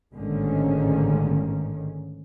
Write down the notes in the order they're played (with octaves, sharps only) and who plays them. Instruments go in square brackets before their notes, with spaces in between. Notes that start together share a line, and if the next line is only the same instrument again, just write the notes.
[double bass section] A1 G#2 D3 D#3 A#3 C#4